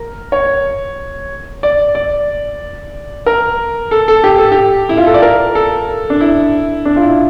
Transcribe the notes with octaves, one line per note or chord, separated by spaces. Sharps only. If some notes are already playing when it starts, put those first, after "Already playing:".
Already playing: A#4
C#5
D5
D5
A#4
A4
A4
G4
A4
G4
E4
F4
A4
D5
A#4
A4
D4
E4
D4
F4
E4